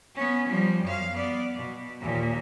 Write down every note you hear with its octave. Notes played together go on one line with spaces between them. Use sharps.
B3 C#4
F3 G3
F#2 F5
B3 D5
B2
D#2 A#2